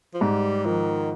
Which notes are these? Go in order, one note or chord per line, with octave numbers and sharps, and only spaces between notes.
F3
G#2 G3
D#3 F3